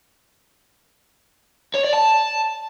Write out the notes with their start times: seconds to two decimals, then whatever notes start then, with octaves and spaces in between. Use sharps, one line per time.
1.74 C#5
1.83 D5
1.93 A5